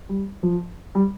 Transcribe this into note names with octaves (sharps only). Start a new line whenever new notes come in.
G3
F3
G3